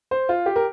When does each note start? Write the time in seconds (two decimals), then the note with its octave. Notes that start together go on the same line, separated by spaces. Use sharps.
0.11 C5
0.29 F4
0.46 G4
0.56 A#4